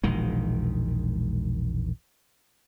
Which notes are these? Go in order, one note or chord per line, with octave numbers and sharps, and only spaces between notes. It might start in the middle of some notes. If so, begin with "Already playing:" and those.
E1 A#1 D#3 G#3